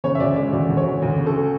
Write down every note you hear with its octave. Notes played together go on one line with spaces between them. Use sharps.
C#3 C#5
E5
D2 D5
G#3 D5
D2 D5
D2
C#5
D2
D2
C#3
A4